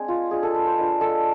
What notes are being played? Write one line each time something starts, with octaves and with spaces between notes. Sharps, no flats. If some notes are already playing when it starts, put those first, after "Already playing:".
Already playing: G#3 C4 D4 G#4 C5
F4
G#3 D4 F4 G#4
A4
B4
C5
G#3 D4 F4 B4
A4